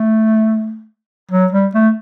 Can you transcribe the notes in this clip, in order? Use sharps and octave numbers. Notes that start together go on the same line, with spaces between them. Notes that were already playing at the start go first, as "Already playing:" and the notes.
Already playing: A3
F#3
G3
A3